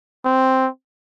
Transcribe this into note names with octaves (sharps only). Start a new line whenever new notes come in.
C4